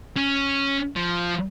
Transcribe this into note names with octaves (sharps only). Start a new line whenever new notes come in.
C#4
F3